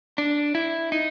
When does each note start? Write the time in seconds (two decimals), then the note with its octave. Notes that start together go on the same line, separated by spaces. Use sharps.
0.18 D4
0.55 E4
0.92 D#4